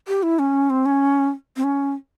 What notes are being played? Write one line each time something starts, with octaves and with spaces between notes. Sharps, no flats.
G4
E4
C#4
C4
C#4
C4
C#4